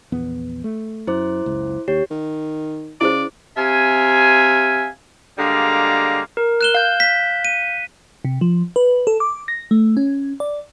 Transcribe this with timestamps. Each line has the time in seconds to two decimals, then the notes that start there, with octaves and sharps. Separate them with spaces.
0.12 A#1 E2 B3
0.64 A3
1.07 F#2 E4 C5 D6
1.46 F#1 C#2
1.88 D#2 G4 C#5
2.11 D#3
3.01 C#3 E4 G#4 C5 D5
3.57 C3 E5 F5 G#5
5.39 D3 G3 G#3 A#3 F5 A#5
6.37 A#4
6.61 F#6 E7 G7
6.74 F5 G6
7.00 B6
7.45 D#7
8.25 C3
8.41 F3
8.76 B4
9.07 A4
9.20 D6
9.48 A#6
9.71 A3
9.97 C#4
10.40 D5